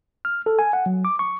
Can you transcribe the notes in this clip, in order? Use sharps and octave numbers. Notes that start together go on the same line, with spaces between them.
F6
A4
G#5
F#5
F#3
D6
C#6